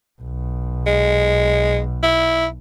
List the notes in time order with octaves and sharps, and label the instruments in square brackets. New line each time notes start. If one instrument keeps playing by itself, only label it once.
[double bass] B1
[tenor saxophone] G#3
E4